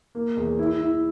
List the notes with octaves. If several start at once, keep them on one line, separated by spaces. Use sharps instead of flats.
A#3
E2
E4
E4